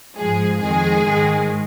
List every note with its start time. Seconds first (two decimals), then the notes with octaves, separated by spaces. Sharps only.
0.16 G#2 F3 G#3 G#4
0.60 F2 D#3 G#3 G#4
1.04 G#2 D#3 G#3